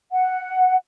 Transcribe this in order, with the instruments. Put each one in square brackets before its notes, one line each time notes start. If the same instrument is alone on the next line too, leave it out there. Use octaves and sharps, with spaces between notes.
[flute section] F#5